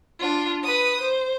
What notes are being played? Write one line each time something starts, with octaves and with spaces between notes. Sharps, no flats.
D4 F4
B4 D#6
C5